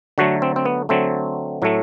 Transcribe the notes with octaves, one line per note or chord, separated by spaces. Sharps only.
D3 F#3 A3 F#4
C4
C4
B3
D3 F#3 A3 C4
A2 F#3 A3